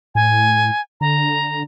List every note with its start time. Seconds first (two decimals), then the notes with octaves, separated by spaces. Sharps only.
0.15 A2 G#5
1.01 D3 A#5